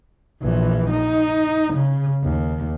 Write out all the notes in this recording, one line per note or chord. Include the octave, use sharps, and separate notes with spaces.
A#1 E3
D#4
C#3
D#2